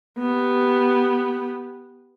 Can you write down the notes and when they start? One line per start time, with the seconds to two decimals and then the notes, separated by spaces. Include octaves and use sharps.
0.19 B3 G4